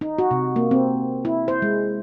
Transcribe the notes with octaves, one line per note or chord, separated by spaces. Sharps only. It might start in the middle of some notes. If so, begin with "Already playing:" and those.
D#4
F#4
C3
A#3
C4
E4
C5
G#3